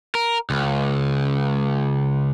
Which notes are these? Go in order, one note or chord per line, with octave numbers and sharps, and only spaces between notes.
A#4
C#2